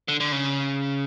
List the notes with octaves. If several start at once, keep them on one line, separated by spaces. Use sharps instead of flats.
D3
D3
C#3